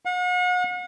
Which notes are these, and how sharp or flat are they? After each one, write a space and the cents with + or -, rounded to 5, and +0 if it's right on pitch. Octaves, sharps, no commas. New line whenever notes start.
F#5 -40